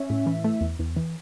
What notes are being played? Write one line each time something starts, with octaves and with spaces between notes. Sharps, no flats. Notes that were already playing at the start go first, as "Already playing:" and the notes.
Already playing: C#4 E5
A2
E3
A3
E2
E2
E3